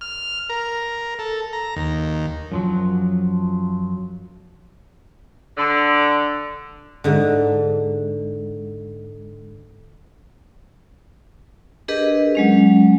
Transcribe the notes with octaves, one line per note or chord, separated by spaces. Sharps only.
F6
A#4
A4
A#5
D#2
F#2 F3 F#3
D3
G#2 D3
D4 G4 G#4 A#4 B4 D#5
F#3 G#3 C#4